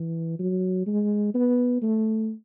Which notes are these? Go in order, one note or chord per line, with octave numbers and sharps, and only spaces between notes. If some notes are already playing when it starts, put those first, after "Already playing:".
Already playing: E3
F#3
G#3
B3
A3